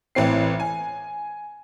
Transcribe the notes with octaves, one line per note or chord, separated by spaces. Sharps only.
A1 E3 C4 C7
G#5